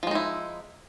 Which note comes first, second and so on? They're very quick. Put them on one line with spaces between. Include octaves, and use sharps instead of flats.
F3 G#3 D#4 E4